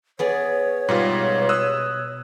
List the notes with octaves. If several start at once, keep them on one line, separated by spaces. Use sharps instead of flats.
B3 G#4 C#5 D5
G#2 B2 G3 F4
D#6 E6 F#6